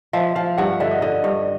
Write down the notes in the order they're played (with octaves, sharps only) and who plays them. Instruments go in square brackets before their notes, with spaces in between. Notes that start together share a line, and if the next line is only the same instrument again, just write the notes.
[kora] F3 [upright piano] E5
[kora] F3 [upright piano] F5
[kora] G2 [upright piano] F#5
[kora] D3 [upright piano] E5
[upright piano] D#5
[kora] D3 [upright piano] D#5
[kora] G2